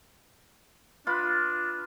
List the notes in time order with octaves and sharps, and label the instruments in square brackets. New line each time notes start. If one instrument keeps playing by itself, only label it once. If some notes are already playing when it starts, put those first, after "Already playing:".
[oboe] D4 [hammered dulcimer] F4 B4